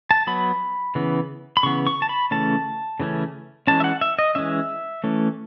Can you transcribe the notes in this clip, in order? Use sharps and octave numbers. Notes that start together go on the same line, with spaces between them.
A5
F#3 B3 B5
C#3 E3 B3
B5
C#3 E3 B3 C#6
C#6
A5
B5
C#3 E3 A3 C#4 A5
C#3 E3 A3 C#4
E3 G#3 C#4 A5
E5
F#5
E5
D#5
E3 G#3 C#4 E5
E3 A3 C#4